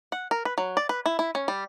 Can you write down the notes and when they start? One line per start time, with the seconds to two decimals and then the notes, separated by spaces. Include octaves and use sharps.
0.12 F#5
0.31 A#4
0.45 B4
0.58 F#3
0.77 D5
0.89 B4
1.06 E4
1.19 E4
1.35 C#4
1.48 G3